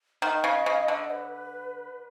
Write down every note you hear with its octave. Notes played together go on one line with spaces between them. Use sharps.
D#3 D#5 F#5
C#3
C#3
D3
B4